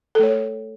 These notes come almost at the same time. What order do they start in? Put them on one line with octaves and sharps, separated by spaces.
A4 A3 C#5